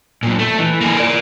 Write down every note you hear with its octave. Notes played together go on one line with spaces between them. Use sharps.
A#2 F#3
A3
E3
A#3 G#4
A#4 D5